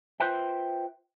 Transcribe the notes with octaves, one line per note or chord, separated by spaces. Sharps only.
F4 B4 C5 E5 G5